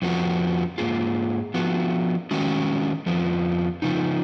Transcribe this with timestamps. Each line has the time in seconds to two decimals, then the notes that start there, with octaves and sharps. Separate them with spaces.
0.02 F2 F3 B3 F#4
0.78 G#2 D#3 A#3 F4 G#4
1.54 F3 B3 F#4
2.31 D#3 G#3 C#4 F#4
3.06 F2 F3 B3
3.82 C#3 F3 B3 D#4